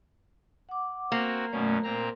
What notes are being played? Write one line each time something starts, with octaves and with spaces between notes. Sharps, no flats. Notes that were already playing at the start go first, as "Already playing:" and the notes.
F#5 D6
A#3 C4 F#4
F#2 B2 A3 C#4 C#5 D5
A#2 C4 A#4 A#5